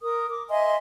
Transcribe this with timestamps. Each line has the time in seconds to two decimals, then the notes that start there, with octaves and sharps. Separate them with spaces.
0.01 A#4 D#6
0.29 D6
0.49 D#5 E5 G#5 C6